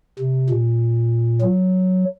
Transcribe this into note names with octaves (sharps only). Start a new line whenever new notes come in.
C3
A#2
F#3